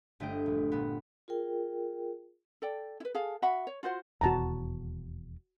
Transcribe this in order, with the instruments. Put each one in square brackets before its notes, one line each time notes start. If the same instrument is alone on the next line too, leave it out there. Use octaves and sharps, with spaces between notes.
[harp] G1 A3 D4 D#5 G5
A#1
A#2 B3
[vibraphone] F4 G#4 A#4 G5
[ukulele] A4 D5 G5
E4 B4
G#4 A4 F5
F#4 E5 F#5 B5
C#5
F4 F#4 C5 F#5
[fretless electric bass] D#1 E2 B2 [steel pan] F#4 A5 A#5